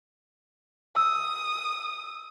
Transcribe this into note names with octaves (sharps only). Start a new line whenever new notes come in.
D#6 E6